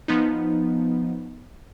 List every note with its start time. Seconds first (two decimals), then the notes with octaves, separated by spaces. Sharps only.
0.08 F3 B3 D#4